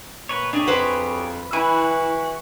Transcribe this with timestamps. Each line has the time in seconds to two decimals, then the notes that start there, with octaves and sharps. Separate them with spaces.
0.29 A#2 B4 C#5
0.53 D4 G4 G#4 C#5
0.67 F2 F#4 B4 C5
1.53 E3 E4 F#4 G#5